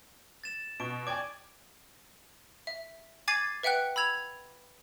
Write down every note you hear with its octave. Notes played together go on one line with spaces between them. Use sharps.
A6 E7
B2 C#6 D7
D5 G5 G#5 D6 G#6
E5
G#5 D6 G#6 A6 C7 D#7
B4 E5 F#5 G5 F#6
B5 E6 G#6 F7